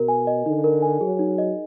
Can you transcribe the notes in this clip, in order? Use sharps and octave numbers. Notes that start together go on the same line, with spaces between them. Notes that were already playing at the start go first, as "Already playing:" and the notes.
Already playing: B2 A#4
G#5
D#5
D3 D#4
A#4
G#5
F#3 G#4
D#4
D#5